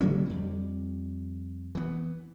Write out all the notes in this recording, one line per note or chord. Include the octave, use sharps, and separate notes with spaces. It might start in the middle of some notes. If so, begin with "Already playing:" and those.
C#3 F#3 A#3 C#4
F2 G3
E3 B3